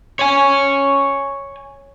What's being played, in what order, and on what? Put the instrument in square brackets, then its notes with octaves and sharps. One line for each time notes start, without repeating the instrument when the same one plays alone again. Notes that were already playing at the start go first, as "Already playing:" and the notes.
[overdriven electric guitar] C#5 G#5